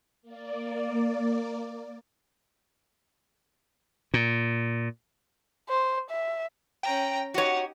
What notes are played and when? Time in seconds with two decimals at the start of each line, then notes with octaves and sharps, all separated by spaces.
0.22 A#3 D5
4.14 A#2
5.69 C5
6.10 E5
6.83 C#4 G5 A#5
7.34 D#4 F#4 G4 C#5 F#5